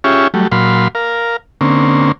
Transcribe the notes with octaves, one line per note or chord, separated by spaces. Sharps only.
C#4 F4 G4 G#4 C#5 E5
F#3 G3 A3
A#2 F#3 F5 B5 C6
A#4 F5
D3 A#3 C4 C#4